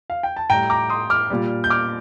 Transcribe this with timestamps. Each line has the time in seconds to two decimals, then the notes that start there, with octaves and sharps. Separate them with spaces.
0.10 F5
0.23 G5
0.37 A5
0.50 A2 G3 G5 A#5
0.70 A#5 D6
0.90 C6 D#6
1.10 D6 F6
1.30 A#2 G3
1.64 G6
1.70 D6 F6